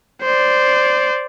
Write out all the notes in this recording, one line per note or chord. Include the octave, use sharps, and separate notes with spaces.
C5 D5